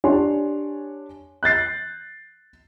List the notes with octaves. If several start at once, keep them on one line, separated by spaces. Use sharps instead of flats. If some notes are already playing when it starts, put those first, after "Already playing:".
D4 G4 C#5 G#5 C6
F#6 G6 A6 C7